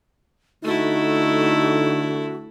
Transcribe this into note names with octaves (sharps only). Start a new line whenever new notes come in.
D3 A3 D#4 E4 F#4